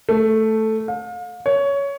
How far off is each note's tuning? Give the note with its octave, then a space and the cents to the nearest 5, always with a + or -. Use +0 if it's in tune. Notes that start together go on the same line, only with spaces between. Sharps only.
A3 +0
F5 +35
C#5 +15